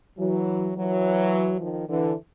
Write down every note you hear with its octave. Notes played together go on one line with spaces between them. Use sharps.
E3 F#3
E3 F#3
D#3 F3
D3 E3